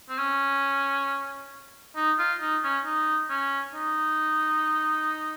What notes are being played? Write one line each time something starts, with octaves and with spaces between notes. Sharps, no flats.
C4
C#4
D#4
F4
D#4
C#4
D#4
C#4
D#4